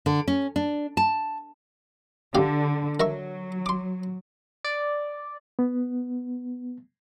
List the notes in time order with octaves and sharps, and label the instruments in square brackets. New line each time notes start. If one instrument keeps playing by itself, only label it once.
[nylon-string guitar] D3
C#4
D4
A5
[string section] D3 [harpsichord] G4 F5
[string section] F#3 [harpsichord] A#4 E5 C#6
[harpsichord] C6 D6
[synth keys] D5
[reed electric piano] B3